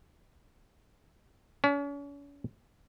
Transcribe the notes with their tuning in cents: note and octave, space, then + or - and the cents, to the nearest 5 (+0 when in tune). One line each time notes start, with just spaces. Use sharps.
C#4 +40